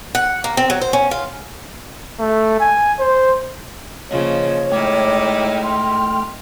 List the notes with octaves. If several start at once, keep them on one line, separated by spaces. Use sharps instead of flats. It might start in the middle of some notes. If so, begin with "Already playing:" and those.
F#5
A#3
C4
F#3
C5
C#4
F4
A3
G#5
C5
C#3 F3 A#3 C#5 D#5
G#3 A3 D#4 E4 G5 D6 F6
C6